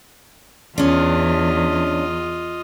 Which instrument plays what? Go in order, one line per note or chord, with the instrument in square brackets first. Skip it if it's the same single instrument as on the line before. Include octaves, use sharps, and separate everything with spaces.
[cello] E2 [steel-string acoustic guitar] C#4 D4 [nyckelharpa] F4 D#5